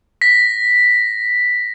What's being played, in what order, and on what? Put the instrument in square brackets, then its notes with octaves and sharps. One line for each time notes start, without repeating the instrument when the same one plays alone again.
[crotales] A#6 B6